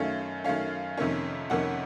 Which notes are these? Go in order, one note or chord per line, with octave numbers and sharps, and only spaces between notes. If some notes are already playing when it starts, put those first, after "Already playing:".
Already playing: F#2 D#3 A3 C#4 F5
F#2 D#3 A3 C#4 F5
F2 C3 D#3 A#3 C#4
F2 C3 D#3 A#3 C#4 F#5